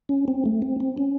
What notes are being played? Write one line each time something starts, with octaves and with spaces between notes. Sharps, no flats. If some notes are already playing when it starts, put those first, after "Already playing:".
C#4
C4
A3
C4
C4
C#4